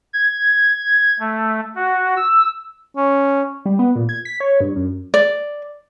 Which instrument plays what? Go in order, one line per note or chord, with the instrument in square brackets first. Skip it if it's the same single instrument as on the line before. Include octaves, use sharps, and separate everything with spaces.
[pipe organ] G#6
A3
F#4
E6
[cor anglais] C#4
[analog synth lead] G3
B3
A#2
G#6
B6
C#5
G2
F#2
[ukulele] D5